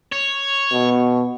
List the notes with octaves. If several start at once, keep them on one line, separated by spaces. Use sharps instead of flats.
C#5
B2